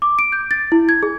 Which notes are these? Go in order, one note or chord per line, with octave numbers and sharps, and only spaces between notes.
D6
D7
G6
A6
E4
G#6
G#4